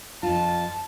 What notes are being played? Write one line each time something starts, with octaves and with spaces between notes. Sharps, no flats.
F2 F4 A5